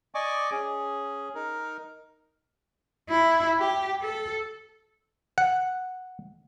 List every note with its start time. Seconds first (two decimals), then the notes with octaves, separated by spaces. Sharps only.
0.15 D5 D#5 G#5 C#6 D6
0.51 C#4 G#4
1.35 D#4 A#4
3.10 E4
3.60 G4
4.02 A4
5.38 F#5